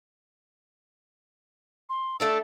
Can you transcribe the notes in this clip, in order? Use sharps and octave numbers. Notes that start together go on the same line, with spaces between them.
C6
A3 D4 A4 E6